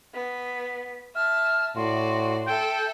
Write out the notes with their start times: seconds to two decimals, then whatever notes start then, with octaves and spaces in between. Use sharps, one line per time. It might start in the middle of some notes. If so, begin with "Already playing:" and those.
0.14 B3 B6
1.15 E5 A5 F6
1.76 A2 F#4 D5 C6
2.47 A4 E5 G5